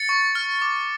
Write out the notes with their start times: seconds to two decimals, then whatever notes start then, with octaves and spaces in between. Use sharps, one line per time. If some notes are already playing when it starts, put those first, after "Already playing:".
Already playing: A6 C#7
0.09 C#6
0.35 F6
0.62 D6